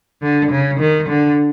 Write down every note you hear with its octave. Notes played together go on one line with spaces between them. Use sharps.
D3
C#3
D#3
D3